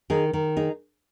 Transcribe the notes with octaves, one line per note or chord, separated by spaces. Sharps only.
D#3 D#4 G#4
D#3
D#4 G#4